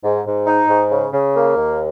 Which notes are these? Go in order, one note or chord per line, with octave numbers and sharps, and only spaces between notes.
G#2
G#2
D#4
G#2
C#3
C#3
A#3
D#2